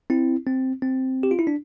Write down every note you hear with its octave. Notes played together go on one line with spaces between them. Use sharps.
C4 E4
C4
C4
G4
F4
E4
D4